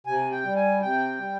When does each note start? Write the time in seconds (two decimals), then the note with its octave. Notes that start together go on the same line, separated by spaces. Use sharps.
0.07 C3 G#5
0.31 G5
0.44 G3
0.56 G#5
0.82 C3 G5
1.19 G3